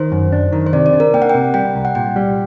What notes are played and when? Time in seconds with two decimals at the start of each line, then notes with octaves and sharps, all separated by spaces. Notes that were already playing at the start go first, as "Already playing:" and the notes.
Already playing: D#3 C5
0.12 F#2
0.32 D4
0.52 D#3
0.67 C5
0.73 C3 D5
0.86 D5
0.93 D4
1.00 A#4
1.14 A#3 G5
1.22 F#5
1.30 C3 G5
1.54 G3 G5
1.75 C2
1.85 F#5
1.95 A#2 G5
2.16 G3